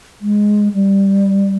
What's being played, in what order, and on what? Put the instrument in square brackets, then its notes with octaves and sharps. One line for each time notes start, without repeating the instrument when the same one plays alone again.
[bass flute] G#3
G3